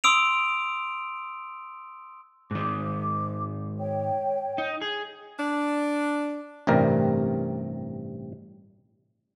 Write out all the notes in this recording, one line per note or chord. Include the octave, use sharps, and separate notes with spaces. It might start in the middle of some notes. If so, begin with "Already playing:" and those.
C6 D#6 E6 D7 F7
G#2 D#3 D6
C#5 G5
D#4
G#4
D4
A1 G2 C3 G3 A#4